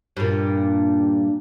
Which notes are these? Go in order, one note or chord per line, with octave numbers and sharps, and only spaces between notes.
G2 A#2